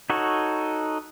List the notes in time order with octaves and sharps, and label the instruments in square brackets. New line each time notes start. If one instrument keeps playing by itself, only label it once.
[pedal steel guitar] D#4 F#4 A4 C#5